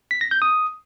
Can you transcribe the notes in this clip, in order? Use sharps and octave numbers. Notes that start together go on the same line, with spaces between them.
B6
A#6
G6
D#6